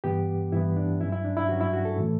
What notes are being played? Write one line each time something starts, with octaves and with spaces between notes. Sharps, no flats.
G2 E3 B3 G4
G2 E3 B3 E4
D4
G2 F#3 C#4 E4
E4
D4
E4
G2 F#3 C#4 F#4
E4
F#4
A4
A2 E3 A3